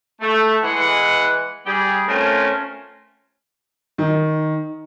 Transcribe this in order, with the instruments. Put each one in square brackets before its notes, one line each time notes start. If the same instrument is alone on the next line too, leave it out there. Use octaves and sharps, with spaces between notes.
[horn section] A3
E3 G#3 F#5
G3 G4 G#4
A3 C4 C#4 F4 A#4 C5
[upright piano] D#3